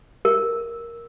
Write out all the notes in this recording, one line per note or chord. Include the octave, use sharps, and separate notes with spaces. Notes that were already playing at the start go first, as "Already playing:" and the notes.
A#4